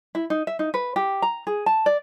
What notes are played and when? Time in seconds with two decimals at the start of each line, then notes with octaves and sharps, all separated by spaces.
0.15 E4
0.30 D#4
0.47 E5
0.59 D#4
0.74 B4
0.96 G4
1.22 A#5
1.47 G#4
1.66 A5
1.86 D5